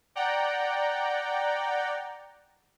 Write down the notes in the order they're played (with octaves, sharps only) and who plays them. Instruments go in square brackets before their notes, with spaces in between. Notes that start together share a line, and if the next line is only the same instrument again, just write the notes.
[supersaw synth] D5 F#5 G5 A#5